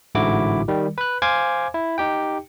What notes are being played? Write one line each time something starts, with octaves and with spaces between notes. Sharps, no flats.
A1 G#2 D3 E4 F#4 D6
D#3 G3
B4 F#6
C5 F5 G#5 D6 G#6
E4
D#4 G4 G5